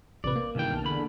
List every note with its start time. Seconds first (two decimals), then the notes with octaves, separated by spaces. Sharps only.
0.24 A1 C3 B4 D5
0.36 A#3
0.55 C#2 G2 B2 D#3 E3 G5
0.71 B1 A5 F6
0.84 E2 D3 B5